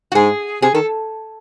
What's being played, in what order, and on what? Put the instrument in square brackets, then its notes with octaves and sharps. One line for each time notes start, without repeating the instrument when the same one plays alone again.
[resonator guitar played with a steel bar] F#4
[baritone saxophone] G#2 [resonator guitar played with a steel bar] G#4
[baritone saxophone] C3 [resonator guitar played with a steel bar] G#4
[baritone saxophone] D#3 [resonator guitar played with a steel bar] A4